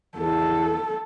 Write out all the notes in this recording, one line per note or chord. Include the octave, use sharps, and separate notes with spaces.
E2 A4